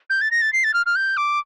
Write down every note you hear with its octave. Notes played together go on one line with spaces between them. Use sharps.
G6
A6
A#6
A6
C7
A6
F6
F6
G6
D6